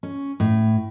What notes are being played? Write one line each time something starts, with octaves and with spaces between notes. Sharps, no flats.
C#4
A2